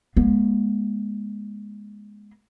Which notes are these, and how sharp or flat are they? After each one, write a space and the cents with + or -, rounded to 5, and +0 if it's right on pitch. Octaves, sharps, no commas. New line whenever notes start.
G#3 +0 B3 -45